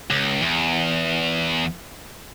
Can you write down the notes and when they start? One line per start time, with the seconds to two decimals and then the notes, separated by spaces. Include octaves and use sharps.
0.10 C#2
0.42 E2